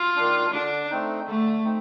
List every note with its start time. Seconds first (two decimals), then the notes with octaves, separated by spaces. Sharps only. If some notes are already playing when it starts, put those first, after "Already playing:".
Already playing: F4
0.16 D#3 A#3 D4
0.53 D3 D4
0.90 A3 C4 D#4
1.27 D3 A3
1.65 A3 C4 D#4